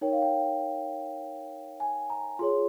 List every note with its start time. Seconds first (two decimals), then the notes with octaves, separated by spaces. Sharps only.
0.01 D#4 A#4 C#5 G5
0.13 F5
0.22 G5
1.80 G#5
2.10 A#5
2.39 F4 G#4 C#5 C6